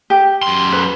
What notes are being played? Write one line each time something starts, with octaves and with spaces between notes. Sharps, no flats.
G4
F#2 C6
B4